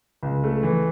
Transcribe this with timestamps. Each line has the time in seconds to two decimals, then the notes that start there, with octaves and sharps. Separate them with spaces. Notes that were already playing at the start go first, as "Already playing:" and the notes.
0.23 C#2
0.44 A3
0.63 E3